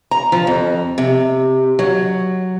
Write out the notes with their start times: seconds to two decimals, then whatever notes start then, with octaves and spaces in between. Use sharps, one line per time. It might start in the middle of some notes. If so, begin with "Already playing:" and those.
0.11 A#5
0.32 F3
0.47 F2
0.98 C3
1.79 F#3